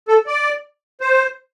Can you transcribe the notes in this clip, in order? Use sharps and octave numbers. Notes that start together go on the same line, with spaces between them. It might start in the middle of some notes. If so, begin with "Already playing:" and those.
A4
D5
C5